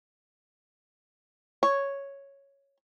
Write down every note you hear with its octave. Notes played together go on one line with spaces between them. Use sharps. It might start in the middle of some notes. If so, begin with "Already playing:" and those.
C#5